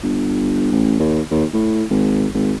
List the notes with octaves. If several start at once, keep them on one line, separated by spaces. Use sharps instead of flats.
G1
A1
D#2
D#2
A2
G#1
G#1